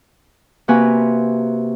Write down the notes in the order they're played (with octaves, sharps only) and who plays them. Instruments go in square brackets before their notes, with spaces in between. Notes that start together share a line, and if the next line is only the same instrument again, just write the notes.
[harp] C3 A#3 F#4 B4 G#5 A#5